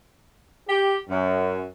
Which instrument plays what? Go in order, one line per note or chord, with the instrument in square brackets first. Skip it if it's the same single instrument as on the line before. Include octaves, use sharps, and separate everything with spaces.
[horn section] G4
F#2